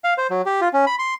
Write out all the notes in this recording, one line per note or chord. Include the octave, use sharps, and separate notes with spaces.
F5
C5
F#3
G4
F4
C#4
B5
C6